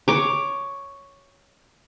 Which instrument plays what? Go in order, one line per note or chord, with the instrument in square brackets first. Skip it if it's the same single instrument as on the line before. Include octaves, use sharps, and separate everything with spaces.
[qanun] C#5 D6